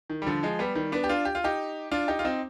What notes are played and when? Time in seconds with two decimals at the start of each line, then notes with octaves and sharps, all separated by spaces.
0.10 D#3
0.22 G3
0.27 D3 F3
0.43 F3 G#3
0.59 G3 B3
0.75 D#3 G3
0.92 B3 D4
1.04 G4
1.09 D4 F4
1.25 G4
1.35 F4
1.44 D#4 G4
1.91 D4 F4
2.08 D#4 G4
2.19 F4
2.25 C4 D#4